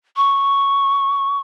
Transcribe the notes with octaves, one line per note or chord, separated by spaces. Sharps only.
C#6